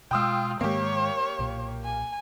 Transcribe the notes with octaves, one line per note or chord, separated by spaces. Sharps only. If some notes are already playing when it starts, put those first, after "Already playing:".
B2 G#3 F4 G5 D#6 E6
G#2 D#3 G#3 A#3 G4 C#5
B1 A#2
G#5